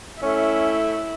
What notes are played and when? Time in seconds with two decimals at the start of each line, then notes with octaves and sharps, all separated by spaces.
0.22 A3 C#4 E4